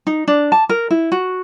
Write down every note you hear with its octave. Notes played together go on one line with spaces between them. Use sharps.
D#4
D4
A5
A#4
E4
F#4